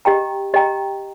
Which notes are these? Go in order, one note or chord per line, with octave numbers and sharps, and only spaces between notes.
G4 D#5 G5 A#5
G4 D#5 G5 A#5